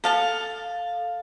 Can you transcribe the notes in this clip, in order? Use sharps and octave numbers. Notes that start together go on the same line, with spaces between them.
A4 F5 A5